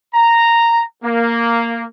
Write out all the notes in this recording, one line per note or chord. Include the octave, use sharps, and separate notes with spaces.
A#5
A#3